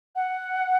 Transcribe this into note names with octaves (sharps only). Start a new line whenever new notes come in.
F#5